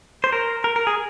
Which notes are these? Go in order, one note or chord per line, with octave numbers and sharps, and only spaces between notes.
C5
A#4
A#4
A#4
G#4